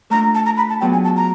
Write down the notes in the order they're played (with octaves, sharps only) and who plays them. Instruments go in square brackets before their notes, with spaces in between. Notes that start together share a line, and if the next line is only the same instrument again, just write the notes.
[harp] A3 D4 F4 [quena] A#5
[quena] A5
A#5
B5
A5
[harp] F#3 B3 D4 F4 G#4 [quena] G5
[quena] G#5
A5
A#5